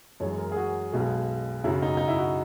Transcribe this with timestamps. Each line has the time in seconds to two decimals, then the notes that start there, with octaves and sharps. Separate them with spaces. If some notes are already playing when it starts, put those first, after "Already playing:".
0.20 F#2 E3 G#3 C#5
0.38 A#4
0.52 G#4
0.56 F#4
0.92 B1 B2 G#3
1.64 F#2 C#3 F#3 E4
1.82 D#4
1.97 D#4
2.08 E4
2.18 F#4